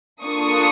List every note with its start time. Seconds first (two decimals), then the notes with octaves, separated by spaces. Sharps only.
0.23 A#3 D4 F4 A4 C#6 D#6